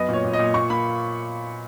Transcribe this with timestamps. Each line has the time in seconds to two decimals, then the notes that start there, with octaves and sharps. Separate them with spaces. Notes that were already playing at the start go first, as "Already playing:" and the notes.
Already playing: F#2 B3 D#5
0.09 A#2 C#5
0.24 A#2
0.33 D#5
0.39 A#2
0.54 A#2 C#6
0.70 A#3 B5